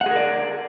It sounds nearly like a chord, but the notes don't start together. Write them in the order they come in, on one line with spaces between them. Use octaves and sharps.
F#5 G#4 A#4 D5